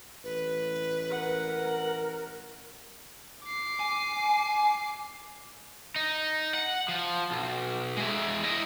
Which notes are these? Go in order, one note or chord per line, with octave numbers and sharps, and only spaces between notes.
A1 B4
A#4 F#5
D6 C7
G#5
D#4
F#5
F3
B1
G#3 E4
E4 D#5